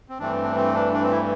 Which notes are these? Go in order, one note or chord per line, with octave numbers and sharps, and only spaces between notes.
C4
G2 E3 A3 C4 D4
D4
C4
D4
D4
C4
E4